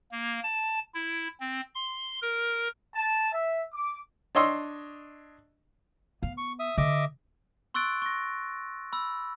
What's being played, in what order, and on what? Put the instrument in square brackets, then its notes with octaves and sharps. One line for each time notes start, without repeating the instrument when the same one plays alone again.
[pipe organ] A#3
A5
E4
C4
C6
A#4
[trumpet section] A5
E5
D6
[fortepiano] D4 C#5 D#5 C6 E6
[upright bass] B3 [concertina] F5
[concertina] C#6
E5 D#6
[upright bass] D3 [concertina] D#5 E5 D6
[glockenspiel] C6 C#6 E6 F#6 A6 D7
C#6 A#6
B5 E6